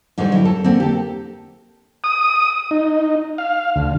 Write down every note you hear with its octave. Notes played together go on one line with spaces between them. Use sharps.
G#2 D3 G3 C5 C#5
F#3 E4
A4
D3 A#3 C4
G4 A4
D#6
D#4
F5
D2